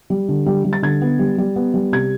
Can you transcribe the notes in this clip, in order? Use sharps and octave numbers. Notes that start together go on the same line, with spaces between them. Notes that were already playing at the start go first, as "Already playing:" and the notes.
G3
D3
G3
G3
A6
D3 G#6
B3
G3
G3
B3
G3
C3 G#6